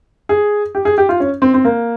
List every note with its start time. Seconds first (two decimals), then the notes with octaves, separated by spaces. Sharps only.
0.29 G#4
0.75 G4
0.85 G#4
0.98 G4
1.09 F4
1.20 C#4
1.42 C4
1.54 C4
1.65 A#3